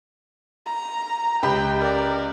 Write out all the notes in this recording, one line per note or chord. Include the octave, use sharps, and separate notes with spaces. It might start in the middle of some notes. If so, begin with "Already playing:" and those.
A#5
C#2 G4 G5 B5
A#4 D5